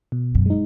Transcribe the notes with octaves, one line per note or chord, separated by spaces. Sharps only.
B2
F#2
G#3 D#4